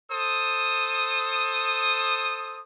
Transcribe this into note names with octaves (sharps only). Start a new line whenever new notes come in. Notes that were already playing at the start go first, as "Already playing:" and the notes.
A4 C5 D#6